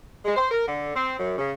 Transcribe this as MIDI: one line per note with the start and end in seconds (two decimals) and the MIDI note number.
0.25 0.35 56
0.36 0.48 72
0.51 0.66 70
0.67 0.92 50
0.95 1.16 60
1.18 1.35 42
1.38 1.52 49